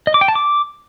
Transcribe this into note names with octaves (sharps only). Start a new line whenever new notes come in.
D#5
D6
G5
A5
D6